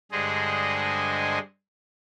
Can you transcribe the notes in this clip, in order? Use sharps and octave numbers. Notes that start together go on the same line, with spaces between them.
G2 D3 G#3 G#4 C5 D#5